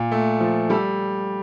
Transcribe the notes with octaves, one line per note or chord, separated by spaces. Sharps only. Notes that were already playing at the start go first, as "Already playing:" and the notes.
Already playing: A#2
A3
F3
G3 A4